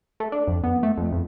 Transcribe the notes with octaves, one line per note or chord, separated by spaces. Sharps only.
A3
D4
F2
B3
A3
F2
F2